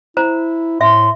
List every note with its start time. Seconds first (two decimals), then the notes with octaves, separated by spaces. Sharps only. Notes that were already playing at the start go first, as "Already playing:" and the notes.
0.17 E4 C5 A#5
0.81 A2 E5 C6